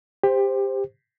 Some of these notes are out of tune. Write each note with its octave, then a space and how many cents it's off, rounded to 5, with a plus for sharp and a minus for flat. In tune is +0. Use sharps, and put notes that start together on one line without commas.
G4 +20 C5 +0